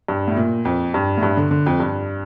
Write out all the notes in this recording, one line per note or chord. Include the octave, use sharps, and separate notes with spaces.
G2
A2
A#2
F2
G2
A2
G2
D3
D3
F2
G2